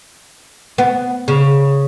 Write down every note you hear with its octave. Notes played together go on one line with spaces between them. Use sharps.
B3
C#3